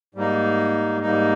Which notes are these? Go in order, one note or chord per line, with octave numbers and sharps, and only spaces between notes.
G#2 G3 A#3 D#4
G#2 G3 A#3 D#4